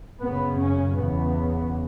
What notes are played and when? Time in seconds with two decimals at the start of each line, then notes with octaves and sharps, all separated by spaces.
0.20 F#2 C#3 B3
0.59 C#4
0.97 E2 C#3 B3